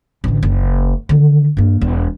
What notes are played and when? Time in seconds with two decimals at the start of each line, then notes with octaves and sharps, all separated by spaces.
0.24 A1 D3
0.43 F#1
1.09 D3 D#3
1.57 G2 A#3
1.81 E1 E2